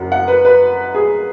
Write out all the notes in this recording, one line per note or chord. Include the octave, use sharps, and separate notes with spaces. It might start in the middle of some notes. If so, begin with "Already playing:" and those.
Already playing: F#1 F#2 F#3 F#5
F#5
B4
B4
G#4